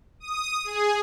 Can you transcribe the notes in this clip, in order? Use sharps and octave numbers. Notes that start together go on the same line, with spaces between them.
D#6
G#4